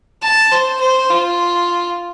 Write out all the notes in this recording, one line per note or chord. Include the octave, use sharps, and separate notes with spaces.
A5
C5
C5
F4